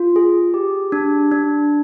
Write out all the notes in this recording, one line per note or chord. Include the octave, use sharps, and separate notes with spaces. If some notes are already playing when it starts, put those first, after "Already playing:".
Already playing: F4
G#4
G4
D4
D4